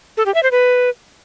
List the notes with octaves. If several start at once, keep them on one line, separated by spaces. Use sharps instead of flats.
A4
G4
E5
C5
B4